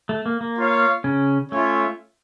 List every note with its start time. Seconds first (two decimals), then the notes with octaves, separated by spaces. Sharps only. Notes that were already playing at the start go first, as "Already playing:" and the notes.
0.09 A3
0.26 A#3
0.41 A#3
0.57 F4 C#5 F5
1.04 C#3 C#4
1.52 A3 C#4 F4 C#5 E5